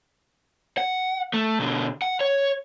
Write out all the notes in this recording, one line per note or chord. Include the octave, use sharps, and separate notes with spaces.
F#5
A3
B2 D3
F#5
C#5